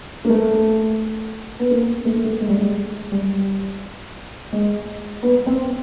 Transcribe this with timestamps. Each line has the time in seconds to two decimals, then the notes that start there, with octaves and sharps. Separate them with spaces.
0.25 A#3
0.29 A3
1.59 B3
1.71 A#3
2.05 A3
2.15 A#3
2.24 A3
2.41 G#3
2.49 G3
2.57 G#3
3.12 G3
4.53 G#3
5.23 B3
5.46 C4